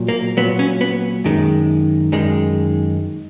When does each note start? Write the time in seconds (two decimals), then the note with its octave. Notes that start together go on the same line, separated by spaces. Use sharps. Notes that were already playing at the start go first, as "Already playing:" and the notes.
Already playing: A#2 F#3
0.08 A#3
0.37 A#2 F#3 B3
0.59 C#4
0.81 B3
1.24 F#2 D#3 G#3
2.12 F#2 D#3 G#3